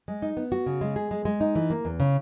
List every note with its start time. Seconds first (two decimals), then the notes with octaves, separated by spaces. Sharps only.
0.08 G#3
0.22 D#4
0.37 B3
0.52 F#4
0.66 C#3
0.81 G#3
0.96 G#4
1.11 G#3
1.25 G#3
1.41 D#4
1.55 E3
1.70 A#3
1.85 E2
2.00 C#3